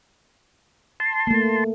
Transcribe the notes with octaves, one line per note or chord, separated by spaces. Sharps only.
A5 C6
A3 A#3